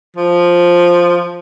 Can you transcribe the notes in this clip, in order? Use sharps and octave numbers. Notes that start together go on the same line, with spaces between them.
F3